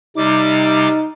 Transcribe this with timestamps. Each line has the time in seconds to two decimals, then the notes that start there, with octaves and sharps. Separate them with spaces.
0.17 C3 G3 D#4 D6